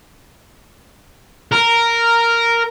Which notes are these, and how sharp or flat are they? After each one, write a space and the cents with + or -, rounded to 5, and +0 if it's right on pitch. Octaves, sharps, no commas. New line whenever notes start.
A#4 -5